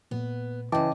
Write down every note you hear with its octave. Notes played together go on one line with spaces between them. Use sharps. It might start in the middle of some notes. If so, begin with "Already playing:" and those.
A#2 B3
C#3 E3 D#5 G5 A5 D6